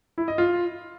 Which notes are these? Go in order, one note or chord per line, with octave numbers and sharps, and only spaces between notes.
E4
D#5
F4